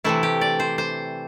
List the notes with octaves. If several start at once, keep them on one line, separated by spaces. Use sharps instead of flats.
C3 E3 A3 E4
G4
D5
C5
C5